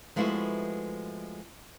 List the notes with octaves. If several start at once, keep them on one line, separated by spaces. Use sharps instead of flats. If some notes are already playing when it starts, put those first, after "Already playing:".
F3 G#3 A3 B3 E4 F#4